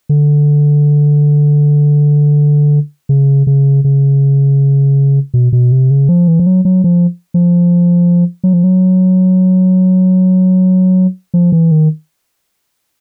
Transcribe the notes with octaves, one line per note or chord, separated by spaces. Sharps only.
D3
C#3
C#3
C#3
B2
B2
C3
C#3
F3
E3
F3
F#3
F#3
F3
F3
F#3
F3
F#3
F3
E3
D#3